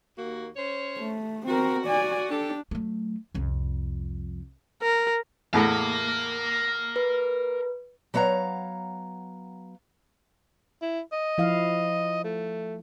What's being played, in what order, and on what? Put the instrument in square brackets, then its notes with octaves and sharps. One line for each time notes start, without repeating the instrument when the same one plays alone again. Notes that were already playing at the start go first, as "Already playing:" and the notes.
[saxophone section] D#2 A#3 F#4
C#4 C5 C#5
[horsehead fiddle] A3
[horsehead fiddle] C4 A#4 [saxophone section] F#4
[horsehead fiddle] D5 G#5
[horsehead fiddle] D4 [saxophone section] G4 A4
[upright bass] F#3 A3
C2 F2
[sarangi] A#4
[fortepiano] E2 A2 [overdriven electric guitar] A#4 F5
[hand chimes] B4
[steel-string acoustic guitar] F#3 B3 C#5 F5 A#5
[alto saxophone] E4
D#5
[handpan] F3 E4 F5
[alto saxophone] A3